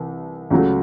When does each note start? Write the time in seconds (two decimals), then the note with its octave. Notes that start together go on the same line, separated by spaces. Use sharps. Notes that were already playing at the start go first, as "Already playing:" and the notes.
Already playing: C2 E3
0.51 C#2 C#3 F#3 A3